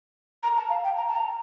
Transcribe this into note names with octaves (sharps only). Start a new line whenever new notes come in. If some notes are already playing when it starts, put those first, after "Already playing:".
A#5
A5
F5
G5
A#5
A5
A#5